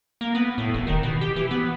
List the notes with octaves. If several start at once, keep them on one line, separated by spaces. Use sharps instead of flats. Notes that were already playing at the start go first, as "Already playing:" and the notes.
A#3
B3
A2
D#1
D#3
B2
G4
E3
B3